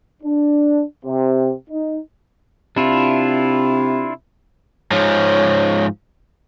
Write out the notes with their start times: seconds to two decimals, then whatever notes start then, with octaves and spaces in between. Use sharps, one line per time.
0.23 D4
1.05 C3
1.70 D#4
2.77 C3 D4 E4 F4
4.91 G#2 F3 C#5